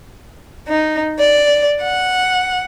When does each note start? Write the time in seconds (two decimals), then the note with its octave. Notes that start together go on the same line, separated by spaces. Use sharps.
0.68 D#4
1.19 D5
1.81 F#5